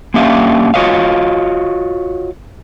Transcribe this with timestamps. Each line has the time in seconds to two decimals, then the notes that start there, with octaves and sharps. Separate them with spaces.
0.14 A#3 C#4 D4 G4 E5 F5
0.74 F4 F#4 A4 C#5 D#5 F5